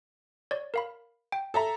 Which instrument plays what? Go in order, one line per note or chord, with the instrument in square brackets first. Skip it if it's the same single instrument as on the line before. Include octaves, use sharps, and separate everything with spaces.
[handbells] C#5 D5
A#4 F5 B5
G5
[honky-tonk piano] A4 E5 A#5